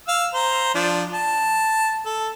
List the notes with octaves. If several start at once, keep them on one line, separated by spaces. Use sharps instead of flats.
F5 E6
C5 A#5
F3 D4
A5
A4